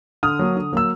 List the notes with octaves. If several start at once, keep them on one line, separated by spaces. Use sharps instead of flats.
D3 D#6 F6
F#3 A#3
D3
F#3 A#3 E6